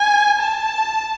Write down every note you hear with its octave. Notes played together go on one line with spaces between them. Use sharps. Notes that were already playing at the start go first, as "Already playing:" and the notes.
Already playing: G#5
A5